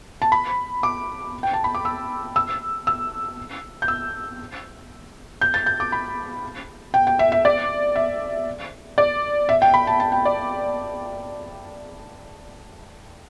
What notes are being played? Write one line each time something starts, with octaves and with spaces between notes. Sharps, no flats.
A5
B5
D6
G5
A5
B5
D6
E6
E6
E6
G6
E6
G6
A6
G6
D6
B5
G5
G5
E5
E5
D5
E5
D5
E5
G5
B5
A5
A5
G5
D5